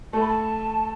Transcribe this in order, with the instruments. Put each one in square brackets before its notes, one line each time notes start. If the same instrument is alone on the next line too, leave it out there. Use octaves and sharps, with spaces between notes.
[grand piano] A3 [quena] A5
[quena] B5
A5